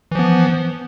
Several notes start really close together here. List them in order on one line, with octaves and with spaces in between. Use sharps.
E3 F3 B3